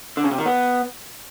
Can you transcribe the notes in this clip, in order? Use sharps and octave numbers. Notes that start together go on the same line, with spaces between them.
D3
C#3
C3
D#3
B3